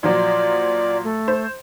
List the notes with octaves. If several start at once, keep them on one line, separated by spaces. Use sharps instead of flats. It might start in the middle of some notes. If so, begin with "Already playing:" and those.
A#2 F3 F#3 D5
A3
C5